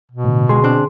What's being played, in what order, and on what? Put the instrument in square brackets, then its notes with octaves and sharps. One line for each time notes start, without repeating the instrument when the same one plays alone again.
[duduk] B2
[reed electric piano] A2 D3
[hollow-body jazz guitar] C#2 G#3 [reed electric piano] D3 G#4 C6
[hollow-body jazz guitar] C4 D4